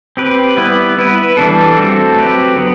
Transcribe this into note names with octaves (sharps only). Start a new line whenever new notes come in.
C4 G4 B4
G3 B3 E4 B4
B3 E4 B4
E3 G3 D4 A4
A3 C4 F#4 A4
F#3 C4 G4 B4
D3 F#3 B3